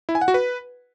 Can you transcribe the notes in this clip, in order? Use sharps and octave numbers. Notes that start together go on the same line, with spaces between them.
E4
G#5
F#5
F#4
B4